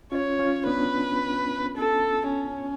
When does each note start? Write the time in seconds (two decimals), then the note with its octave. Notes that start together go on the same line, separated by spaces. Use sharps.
0.12 C#4 F4 C#5
0.39 C#4 F4
0.66 B3 D4 B4
1.78 A4
2.32 C#4